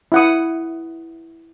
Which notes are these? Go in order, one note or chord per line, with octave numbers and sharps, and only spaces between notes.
E4 F#5 D#6